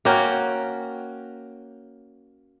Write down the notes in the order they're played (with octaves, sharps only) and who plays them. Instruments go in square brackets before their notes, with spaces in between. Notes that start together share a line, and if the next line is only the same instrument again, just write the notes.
[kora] A#3 C#4 F#4 G5